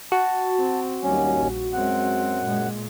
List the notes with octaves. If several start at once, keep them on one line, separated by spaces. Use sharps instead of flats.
F#4 A5
C4
D#2 F#3 G3 C#4
A#1
F#2 G#3 C4 F#5
A#2 G#3